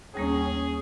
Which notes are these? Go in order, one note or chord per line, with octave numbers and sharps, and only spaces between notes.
D#2 G3 A#3 C#4 G#4